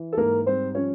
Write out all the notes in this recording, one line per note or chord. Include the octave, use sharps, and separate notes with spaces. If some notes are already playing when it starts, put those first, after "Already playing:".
Already playing: E3
A4
G#2 A#3 A#4
G3 C4 C5
F3 C#4 C#5